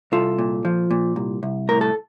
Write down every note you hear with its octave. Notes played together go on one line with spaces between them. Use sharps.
C2 F4 A4
A#2
F3
A#2
C2
C2
A2 A#4
A4